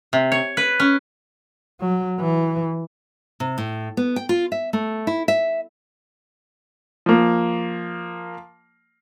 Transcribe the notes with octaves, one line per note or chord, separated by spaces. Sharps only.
C3
C#5
B4
C#4
F#3
E3
C3
A2
B3
G5
F4
E5
A3
E4
E5
F3 A#3